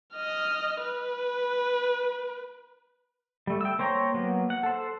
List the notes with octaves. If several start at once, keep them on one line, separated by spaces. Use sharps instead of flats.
D#5 F6
B4
G3 A3
G5 E6
A#3 C5 C#5 G5 A#5
F#3 A#3 B3
F#5
A4 C5